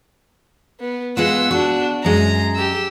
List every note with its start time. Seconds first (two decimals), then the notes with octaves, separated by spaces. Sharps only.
0.80 B3
1.17 G#3 B3 F4 F#5 E6
1.51 D4 F#4
2.05 F#2 G#3 A#5
2.55 G4 E6